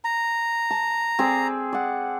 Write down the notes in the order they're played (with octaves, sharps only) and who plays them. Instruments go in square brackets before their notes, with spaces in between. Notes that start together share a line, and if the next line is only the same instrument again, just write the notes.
[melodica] A#5
[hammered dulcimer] A5
C4 G#4 D5
D5 F#5